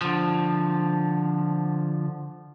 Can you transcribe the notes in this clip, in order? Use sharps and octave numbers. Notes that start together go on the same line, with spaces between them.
D3 F3